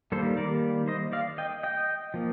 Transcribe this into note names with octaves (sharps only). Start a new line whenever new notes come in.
D#3 G3 A#3 A4 C5
A#4 D5
C5 D#5
D5 F5
D#5 G5
D#5 G5
F3 A#3